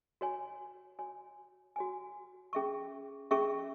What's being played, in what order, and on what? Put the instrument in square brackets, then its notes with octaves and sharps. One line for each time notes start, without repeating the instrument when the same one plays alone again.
[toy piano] F#4 C#5 G#5
F#4 C#5 G#5
F#4 C#5 G#5
C#4 G#4 E5 C#6
C#4 G#4 E5 C#6